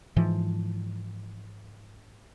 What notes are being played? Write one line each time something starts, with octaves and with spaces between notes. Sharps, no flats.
G#2 E3 F3